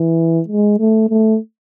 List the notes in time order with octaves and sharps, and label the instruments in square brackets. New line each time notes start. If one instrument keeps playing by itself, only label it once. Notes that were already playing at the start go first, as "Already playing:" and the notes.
Already playing: [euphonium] E3
G#3
A3
A3